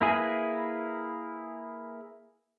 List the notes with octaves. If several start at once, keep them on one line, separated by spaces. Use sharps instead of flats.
A#3 E4 G#4 B4 G#5